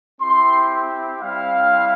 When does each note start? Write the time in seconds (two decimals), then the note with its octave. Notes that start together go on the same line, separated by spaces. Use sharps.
0.20 C4 E4 G4 C6
1.21 G3 C4 E4 F5